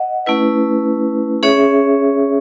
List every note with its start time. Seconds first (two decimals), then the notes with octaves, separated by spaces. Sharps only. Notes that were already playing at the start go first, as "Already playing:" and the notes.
Already playing: D#5 F#5
0.26 A3 C#4 E4 B4
1.43 C#4 G#4 C#5 E5